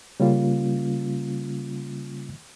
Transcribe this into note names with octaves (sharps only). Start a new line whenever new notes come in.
C#3 G3 A#3 C#4 F4